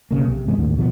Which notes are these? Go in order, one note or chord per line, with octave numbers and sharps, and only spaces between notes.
B1 E2 C#3 A#3
C3
G2 E3 G#3 B3
D#2 A2 D3
B2 F3 A#3 B3